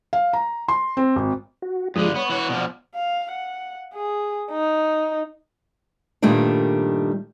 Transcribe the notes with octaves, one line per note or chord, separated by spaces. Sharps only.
F5
A#5
C6
C4
G#1
F#4
G2 D3 F3 G#3 D#6
B3 C#5
E3 F#4
B2 F3 D5
F5
F#5
G#4
D#4
G2 A#2 D#3 G3 A3 D4